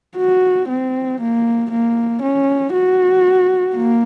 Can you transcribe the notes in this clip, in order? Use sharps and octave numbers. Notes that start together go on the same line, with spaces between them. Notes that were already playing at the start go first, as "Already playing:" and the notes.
F#4
C4
A#3
A#3
C#4
F#4
A#3